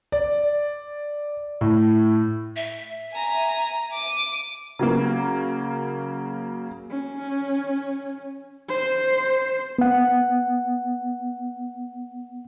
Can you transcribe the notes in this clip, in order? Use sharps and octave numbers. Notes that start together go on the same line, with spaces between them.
D5
A2
E5
G#5 A#5
D6 D#7
C#3 F#3 A#3
C#4
C5
B3 F#5